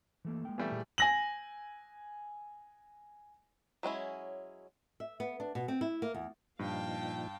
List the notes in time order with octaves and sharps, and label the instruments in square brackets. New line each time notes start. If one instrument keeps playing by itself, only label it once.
[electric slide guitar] E3 A3 A#3
G#3 A#3 G5
[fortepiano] E3 G3 A3 [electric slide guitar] B3
[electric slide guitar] A#2 G4 G#4
[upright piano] G#5 A#6 F#7
[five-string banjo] F#3 G#3 C#4 E4
[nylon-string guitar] E5
B3
D4
B2
C4
E4
A#3
E2
[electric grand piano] G2 [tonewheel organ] A#2 F3 D#4 [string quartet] F5 G5 A5